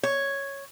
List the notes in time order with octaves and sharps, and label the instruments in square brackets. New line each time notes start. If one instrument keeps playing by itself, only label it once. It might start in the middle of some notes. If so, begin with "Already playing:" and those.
[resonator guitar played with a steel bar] C#5